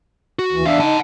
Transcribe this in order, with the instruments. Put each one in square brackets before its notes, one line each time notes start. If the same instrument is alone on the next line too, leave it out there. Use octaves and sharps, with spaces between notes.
[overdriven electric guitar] F#4
[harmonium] D#2 E3
[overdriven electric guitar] E2 F5 [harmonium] D4 E5
[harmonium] D#4 [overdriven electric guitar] F#5 A5